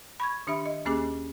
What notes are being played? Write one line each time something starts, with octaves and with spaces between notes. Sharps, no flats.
B5 C#6 G#6
D#3 D4 G4 E5 B5
D#5
D#2 A#3 C#4 G4 G#4 D6